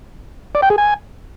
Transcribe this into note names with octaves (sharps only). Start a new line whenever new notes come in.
D5
G5
G#4
G#5